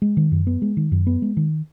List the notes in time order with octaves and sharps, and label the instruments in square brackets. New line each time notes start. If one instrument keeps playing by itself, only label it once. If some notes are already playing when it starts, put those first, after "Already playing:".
[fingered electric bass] G#3
D#3
F#2
B3
G#3
D#3
F#2
B3
G#3
D#3